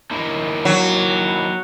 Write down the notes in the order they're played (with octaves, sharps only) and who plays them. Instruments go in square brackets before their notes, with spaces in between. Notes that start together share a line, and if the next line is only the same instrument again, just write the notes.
[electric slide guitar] A#3 D#4 E4
[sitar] F#3